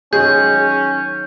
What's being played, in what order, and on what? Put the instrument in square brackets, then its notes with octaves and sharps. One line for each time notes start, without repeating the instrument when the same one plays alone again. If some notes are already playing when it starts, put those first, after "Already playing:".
[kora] D#3 F#3 G#3 [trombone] C#4 [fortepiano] G#4 [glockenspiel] G6